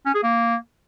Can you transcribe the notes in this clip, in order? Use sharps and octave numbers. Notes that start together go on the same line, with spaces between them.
C#4
G#4
A#3